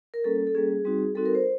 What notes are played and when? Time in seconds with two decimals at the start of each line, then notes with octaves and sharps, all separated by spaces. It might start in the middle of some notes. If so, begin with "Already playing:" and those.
0.14 A#4
0.24 G3 A#3 C#4 A4
0.47 A4
0.55 G3 A#3 C#4 G#4
0.85 G3 C4 D#4 F#4
1.15 G3 C4 D#4 F#4 A4
1.26 A#4
1.35 C5